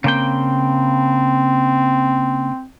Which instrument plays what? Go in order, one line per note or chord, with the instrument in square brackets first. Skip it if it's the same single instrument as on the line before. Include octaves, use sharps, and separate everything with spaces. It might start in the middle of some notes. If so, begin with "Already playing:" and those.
[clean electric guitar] C#3 A#3 G5 [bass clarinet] C4